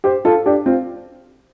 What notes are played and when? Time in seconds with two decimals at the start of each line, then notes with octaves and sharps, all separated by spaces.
0.04 G4 C5
0.25 F4 A4
0.46 D4 G4
0.66 C4 F4